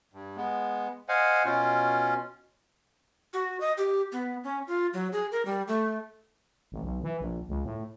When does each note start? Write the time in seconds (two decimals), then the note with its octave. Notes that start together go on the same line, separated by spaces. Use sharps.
0.13 G2
0.37 G#3 B3
1.09 C5 D#5 F5 F#5 G#5
1.45 B2 C#4 F4
3.34 F#4
3.61 D#5
3.78 G4
4.12 B3
4.44 C#4
4.67 F4
4.94 F#3
5.13 G#4
5.32 A#4
5.45 G3
5.68 A3
6.72 A1
6.84 B1
7.03 E3
7.21 A#1
7.49 C#2
7.65 A2